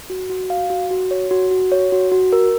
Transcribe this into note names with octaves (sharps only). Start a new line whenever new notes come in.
F#4
F#4
F5
F#4
F#4
C#5
F#4
F#4
C#5
F#4
F#4
A#4